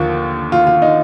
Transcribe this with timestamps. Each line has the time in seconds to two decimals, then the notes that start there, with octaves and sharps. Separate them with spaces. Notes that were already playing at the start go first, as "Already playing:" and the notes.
Already playing: D#2 D3 F3 F4
0.52 F4
0.67 F4
0.82 D#4